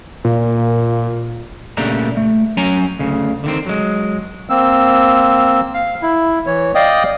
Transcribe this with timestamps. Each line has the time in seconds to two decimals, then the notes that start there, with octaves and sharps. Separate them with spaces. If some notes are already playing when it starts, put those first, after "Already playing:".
0.25 A#2
1.77 A#2 C#3 A3 D4 G4 A#5
2.17 A3
2.57 F#3 C#4 G#5 A#5
2.99 D2 C#3
3.44 D3 D#3 C4
3.66 F#3 G#3
4.50 A#3 C4 E6
5.74 F5
6.02 E4
6.46 E3 C#5
6.75 D5 D#5 F5 G5 D#6